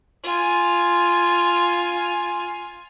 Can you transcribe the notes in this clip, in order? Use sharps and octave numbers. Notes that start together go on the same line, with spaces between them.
F4 G#5